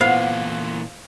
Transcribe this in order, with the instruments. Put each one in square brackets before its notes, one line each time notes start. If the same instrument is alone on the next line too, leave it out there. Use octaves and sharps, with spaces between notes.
[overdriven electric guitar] A#2 E3 [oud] B3 [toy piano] C5 [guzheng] F5